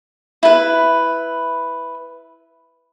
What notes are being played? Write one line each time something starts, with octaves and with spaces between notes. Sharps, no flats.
E4 B4